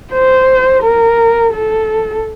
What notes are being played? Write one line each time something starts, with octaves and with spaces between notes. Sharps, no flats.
C5
A#4
A4